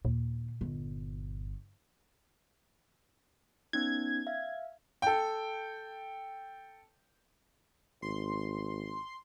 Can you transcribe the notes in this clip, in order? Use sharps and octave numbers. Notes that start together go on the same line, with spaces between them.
D#2 A#2
G1
B3 C#4 D#4 G#6
E5 F5
A4 G5
G#1 C6